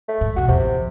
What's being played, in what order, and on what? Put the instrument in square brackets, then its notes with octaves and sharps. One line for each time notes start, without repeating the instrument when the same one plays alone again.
[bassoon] A3
[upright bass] G#2
[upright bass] E2 B2 [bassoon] F#4
[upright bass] A1 E2 [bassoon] C3
[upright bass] F2